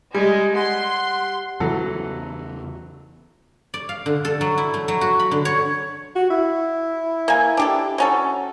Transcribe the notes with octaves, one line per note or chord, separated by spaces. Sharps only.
G3 G#3 G#5
F#5 C6
E2 C#3 E3 F#3 B3 A4
D5
F5
D3
A4
F#3
E4
A3
F#3
F#4
B5
D3
C#5
F#4
E4
A#3 G#5
D4 G4 A4
F#3 C#4 A4